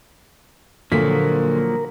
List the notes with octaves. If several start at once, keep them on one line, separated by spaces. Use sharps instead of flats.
A#2 D3 F3 F#3 A#3 A#4 B6